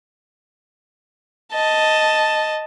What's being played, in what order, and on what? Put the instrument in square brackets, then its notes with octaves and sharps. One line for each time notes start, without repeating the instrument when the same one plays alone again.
[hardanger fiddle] D#5 A5